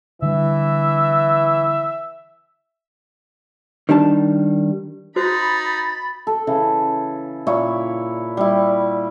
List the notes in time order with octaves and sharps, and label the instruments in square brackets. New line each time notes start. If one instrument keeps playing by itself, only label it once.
[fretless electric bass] D3 G3 [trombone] E3 [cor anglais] E5
[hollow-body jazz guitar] D#3 G3 D4 A5
[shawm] D#4 [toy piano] F#4 C5 [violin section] B5 [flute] A6
[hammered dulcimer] A4
C#3 E3
A#2 E4 C#5
G3 E4